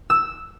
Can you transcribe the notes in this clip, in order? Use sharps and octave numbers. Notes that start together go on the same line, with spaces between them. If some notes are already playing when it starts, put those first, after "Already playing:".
E6